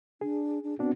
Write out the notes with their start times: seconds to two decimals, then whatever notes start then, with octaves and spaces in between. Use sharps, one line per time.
0.21 D4 G#4
0.64 D4
0.79 B3 C4 D4 F#4